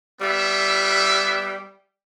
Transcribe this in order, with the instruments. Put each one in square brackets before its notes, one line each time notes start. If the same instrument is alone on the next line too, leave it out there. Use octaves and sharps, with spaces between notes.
[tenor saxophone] G3 [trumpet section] B3 E5